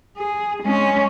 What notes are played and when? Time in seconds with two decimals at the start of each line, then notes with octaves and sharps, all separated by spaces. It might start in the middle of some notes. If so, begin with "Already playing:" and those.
0.17 G#4
0.63 G#3 C#4